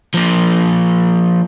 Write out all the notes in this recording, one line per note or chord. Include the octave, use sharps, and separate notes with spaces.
F3 A#3